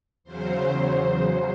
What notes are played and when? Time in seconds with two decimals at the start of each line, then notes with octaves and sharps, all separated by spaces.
0.24 E2 C#3 F#3 C5
0.59 C5
0.94 C5